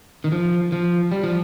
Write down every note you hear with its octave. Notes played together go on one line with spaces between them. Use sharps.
D#3
F3
F3
G3
F3